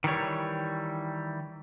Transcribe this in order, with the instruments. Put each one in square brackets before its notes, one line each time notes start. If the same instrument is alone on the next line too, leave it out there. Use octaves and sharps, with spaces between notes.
[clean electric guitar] D#3 E3 G3 C#5